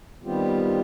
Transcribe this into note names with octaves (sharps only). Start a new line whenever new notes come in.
D#3 G3 B3 C4 F4 G4